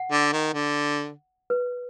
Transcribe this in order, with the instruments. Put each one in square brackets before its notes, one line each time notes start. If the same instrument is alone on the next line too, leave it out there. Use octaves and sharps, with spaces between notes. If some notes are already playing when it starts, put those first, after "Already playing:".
Already playing: [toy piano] F#5
[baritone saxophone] D3
D#3
D3
[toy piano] B4